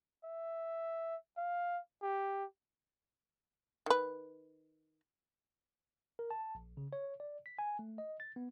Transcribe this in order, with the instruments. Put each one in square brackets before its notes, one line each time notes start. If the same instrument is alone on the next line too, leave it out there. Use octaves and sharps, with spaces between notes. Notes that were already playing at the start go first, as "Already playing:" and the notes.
[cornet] E5
F5
G4
[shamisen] D#3 B4
[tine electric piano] A#4
A5
A#1
C#3
C#5
D5
B6
G#5
A3
D#5
A6
B3